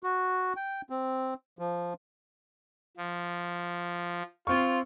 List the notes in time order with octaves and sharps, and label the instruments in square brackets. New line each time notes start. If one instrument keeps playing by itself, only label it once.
[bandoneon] F#4
G5
C4
F3
[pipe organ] F3
[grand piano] C4 C#6 [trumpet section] F4